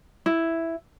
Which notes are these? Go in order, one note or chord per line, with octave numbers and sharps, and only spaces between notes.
E4